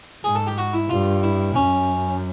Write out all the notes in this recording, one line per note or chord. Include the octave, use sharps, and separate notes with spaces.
G#2 G#4
A4
G4
F#4
E4
G2 F4
E4
F#2 C#4